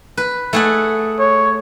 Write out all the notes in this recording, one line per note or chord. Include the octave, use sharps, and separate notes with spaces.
B4
A3 G#4 F#5
C#5